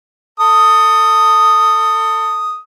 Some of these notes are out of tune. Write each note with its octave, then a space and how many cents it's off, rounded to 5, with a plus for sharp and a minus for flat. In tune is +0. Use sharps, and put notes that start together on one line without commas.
A4 +25 D#6 +0